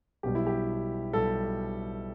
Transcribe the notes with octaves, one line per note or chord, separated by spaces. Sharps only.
B1 B2 G3 G4
E4
G4
B1 B2 G3 A4